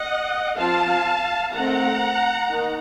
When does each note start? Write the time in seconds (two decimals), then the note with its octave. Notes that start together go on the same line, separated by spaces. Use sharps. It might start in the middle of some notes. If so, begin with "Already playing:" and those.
Already playing: D#5 F#5
0.58 F3 C4 F4 F5 A5
1.53 D#3 A3 C4 F#5 A#5
2.48 D#3 A#3 D#4